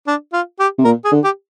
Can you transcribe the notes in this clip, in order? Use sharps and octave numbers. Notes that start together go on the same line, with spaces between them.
D4
F4
G4
C3
A#2 A#4
G#4
D3
G4